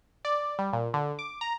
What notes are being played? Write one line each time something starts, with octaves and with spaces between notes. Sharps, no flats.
D5
G3
A#2
D3
D6
A#5